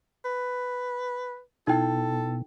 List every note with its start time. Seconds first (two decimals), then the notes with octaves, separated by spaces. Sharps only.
0.25 B4
1.67 B2 D#4 E4 A4 G5